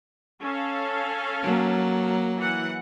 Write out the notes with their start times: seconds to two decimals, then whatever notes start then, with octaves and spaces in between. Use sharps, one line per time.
0.41 C#4 A4 F5
1.42 F#3 A#3
2.37 E3 F#5